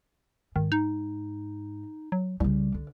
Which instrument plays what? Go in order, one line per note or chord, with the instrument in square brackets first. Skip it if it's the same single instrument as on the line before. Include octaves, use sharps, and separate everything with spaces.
[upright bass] G#2 [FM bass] D#3
[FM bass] D#4
F#3
[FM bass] C2 [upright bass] C#3 G3
[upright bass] D3